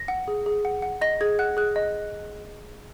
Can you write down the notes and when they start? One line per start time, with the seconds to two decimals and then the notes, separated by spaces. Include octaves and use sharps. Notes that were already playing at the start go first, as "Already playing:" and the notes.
Already playing: A#6
0.08 F#5
0.28 G#4
0.46 G#4
0.65 F#5
0.82 F#5
1.01 D#5 A#6
1.21 G#4 G#6
1.39 F#5 F#6
1.57 G#4 F#6
1.76 D#5